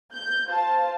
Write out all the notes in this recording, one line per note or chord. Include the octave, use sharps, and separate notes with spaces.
G6
F4 C5 A5